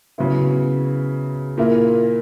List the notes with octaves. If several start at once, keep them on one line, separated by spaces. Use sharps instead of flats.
C#3 F#3 B3 E4
A#2 A#3 E4